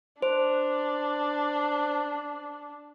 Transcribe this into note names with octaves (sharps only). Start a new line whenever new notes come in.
D4 C5